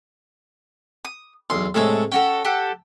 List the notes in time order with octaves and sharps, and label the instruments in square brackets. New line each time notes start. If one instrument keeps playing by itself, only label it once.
[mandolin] D#6
[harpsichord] B1 E2 [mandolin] C6
[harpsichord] A2 C3 G#3 [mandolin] A4 C#5 E6
[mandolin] C#4 F#4 A4 [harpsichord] G5
[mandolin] G4 A4 F#5